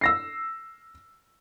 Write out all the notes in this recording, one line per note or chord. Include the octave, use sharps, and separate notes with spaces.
E6 A#6 C7